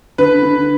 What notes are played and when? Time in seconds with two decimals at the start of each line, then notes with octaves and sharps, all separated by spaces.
0.18 D3 B4
0.43 D3